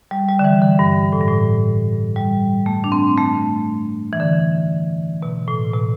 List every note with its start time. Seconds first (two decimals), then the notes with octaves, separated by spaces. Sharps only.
0.11 G3
0.29 G3
0.39 D3
0.44 E3
0.62 D3
0.79 G2
1.13 A2
1.21 G2
1.28 A2
2.16 G3
2.66 A3
2.84 D4
2.92 C4
3.18 A3
4.13 E3
4.20 D3
5.22 B2
5.48 A2
5.73 B2